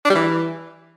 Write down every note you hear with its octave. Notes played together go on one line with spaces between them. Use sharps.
D4
G3
E3